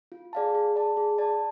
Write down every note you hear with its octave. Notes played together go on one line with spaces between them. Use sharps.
F4
G#4 D5 F5 A5
G#4
D5 A5
G#4
D5 A5